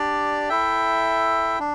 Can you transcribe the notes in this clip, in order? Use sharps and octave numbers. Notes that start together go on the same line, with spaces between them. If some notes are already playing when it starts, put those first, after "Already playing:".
Already playing: D4 G4 D5
E4 A4 E5 G5
D4